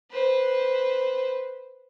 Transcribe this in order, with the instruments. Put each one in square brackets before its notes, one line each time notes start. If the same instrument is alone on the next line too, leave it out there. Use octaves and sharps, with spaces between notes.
[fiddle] B4 C5